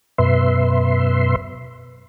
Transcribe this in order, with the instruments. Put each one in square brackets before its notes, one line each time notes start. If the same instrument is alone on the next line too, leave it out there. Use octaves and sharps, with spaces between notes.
[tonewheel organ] F#2 B2 B4 E5 C6